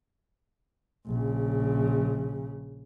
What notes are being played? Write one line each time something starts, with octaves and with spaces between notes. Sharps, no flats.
A#1 C#3